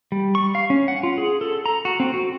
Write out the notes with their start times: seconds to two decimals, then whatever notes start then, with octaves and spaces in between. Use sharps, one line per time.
0.12 G3
0.35 C#6
0.55 F5
0.70 C#4
0.88 F#5
1.03 F4
1.18 G#4
1.41 A4
1.66 A#5
1.85 F#4
2.00 C4
2.14 F#4